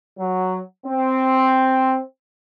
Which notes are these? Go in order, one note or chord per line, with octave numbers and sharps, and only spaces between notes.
F#3
C4